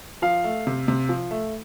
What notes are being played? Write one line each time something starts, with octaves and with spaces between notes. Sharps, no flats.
F3 F5
A3
C3
C3
F3
A3